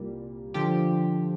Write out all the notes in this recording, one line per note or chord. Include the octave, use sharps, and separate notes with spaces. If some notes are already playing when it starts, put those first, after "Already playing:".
Already playing: C2 A#2 G3 A#3
D3 F3 G4